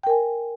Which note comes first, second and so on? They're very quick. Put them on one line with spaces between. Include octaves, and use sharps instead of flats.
G5 A#4 G#5